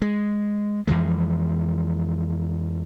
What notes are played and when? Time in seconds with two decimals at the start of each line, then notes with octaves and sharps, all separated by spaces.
0.02 G#3
0.87 F2 E3 F3 G#3